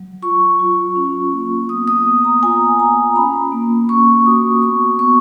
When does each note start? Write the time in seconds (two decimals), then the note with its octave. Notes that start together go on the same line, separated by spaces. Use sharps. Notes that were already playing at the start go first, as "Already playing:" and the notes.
Already playing: F#3
0.22 F4 C#6
0.59 F4
0.96 C#4
1.32 A#3
1.69 B3 D#6
1.88 D#6
2.06 B3
2.24 A#5
2.43 F4 G#5
2.79 F4 A#5
3.16 C#4 B5
3.52 A#3
3.89 C#4 C#6
4.26 F#4 D#6
4.62 B3 C#6
4.99 B3 C#6